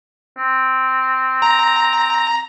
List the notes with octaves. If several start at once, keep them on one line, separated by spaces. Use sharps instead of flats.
C4
A#5